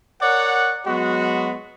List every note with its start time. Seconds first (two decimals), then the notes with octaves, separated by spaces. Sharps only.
0.21 A#4 C#5 D5 F#5
0.85 F#3 G#3 B3 F#4